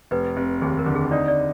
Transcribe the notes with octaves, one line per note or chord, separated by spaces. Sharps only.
F1 B4
F1
D#2 G#4
A#4
D3
G#4
D#4 D5
D5